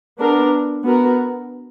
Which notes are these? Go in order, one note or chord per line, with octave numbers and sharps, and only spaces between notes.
B3 D4 A#4
B3 F#4 A#4